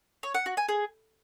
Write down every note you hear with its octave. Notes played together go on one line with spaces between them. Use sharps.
C#5
F#5
F#4
G#5
G#4